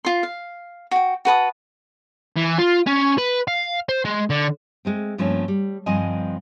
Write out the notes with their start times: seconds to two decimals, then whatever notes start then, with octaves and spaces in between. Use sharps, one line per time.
0.05 F4 C6
0.23 F5
0.91 F#4 G5
1.25 F#4 B4 A5 D#6
2.36 E3
2.58 F4
2.86 C#4
3.18 B4
3.48 F5
3.89 C5
4.05 G#3
4.30 D3
4.85 G#3 A3 C4
5.18 G2 F3 A3 A#3 C4 C#4
5.48 G3
5.86 G2 D3 F3 C4 D#5 G#5